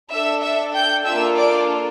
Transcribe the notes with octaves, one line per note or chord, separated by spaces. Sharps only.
D4 A4 E5 E6
E5 E6
G5 G6
A#3 D4 F4 A4 E5 E6
D5 D6